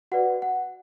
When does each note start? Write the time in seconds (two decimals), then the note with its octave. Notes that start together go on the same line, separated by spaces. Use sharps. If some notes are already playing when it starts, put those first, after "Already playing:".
0.12 F#4 B4 D5 F#5
0.42 F#5